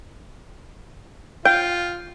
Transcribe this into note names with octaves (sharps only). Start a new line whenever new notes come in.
F4 G5